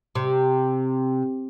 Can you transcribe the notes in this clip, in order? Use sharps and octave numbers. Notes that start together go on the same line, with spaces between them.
C3